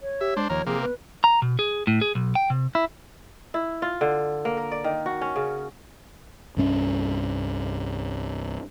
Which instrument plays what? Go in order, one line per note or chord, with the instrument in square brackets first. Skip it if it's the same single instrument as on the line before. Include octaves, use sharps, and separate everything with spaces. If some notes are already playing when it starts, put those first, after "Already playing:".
[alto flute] C#5
[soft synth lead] G4 [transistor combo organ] E5
[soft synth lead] G#3 [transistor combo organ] D4 C5
[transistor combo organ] D#2 A#4 [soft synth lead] F3 [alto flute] C#5
[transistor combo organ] C3 A#3 [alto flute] G#4
[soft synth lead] B3 [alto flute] B4
[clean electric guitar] A#5
B2
G#4
A2
G#4
B1
G5
C3
E4
[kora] E4
F4
D3
A#3
A#4
D5
D#3
F#4
C#4
C#3
[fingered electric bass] C2 G2 C#4